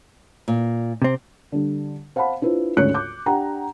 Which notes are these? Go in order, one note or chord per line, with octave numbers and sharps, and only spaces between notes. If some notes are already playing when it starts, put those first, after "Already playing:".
A#2
C3 C4
D3 G3
C5 F5 F#5 A5 B5
D4 E4 F4 B4 C5
D2 G#2 C#3 C#5 F#6 C#7
D6 G6
D4 G4 F#5 G5 A#5